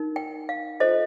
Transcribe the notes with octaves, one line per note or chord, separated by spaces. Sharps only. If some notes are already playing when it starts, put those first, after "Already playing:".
Already playing: D#4 A#4
G5
F5
F4 A4 C5 D#5